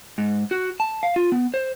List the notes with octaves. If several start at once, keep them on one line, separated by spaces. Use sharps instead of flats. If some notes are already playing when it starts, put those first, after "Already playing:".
G#2
F#4
A5
F5
F4
B3
C5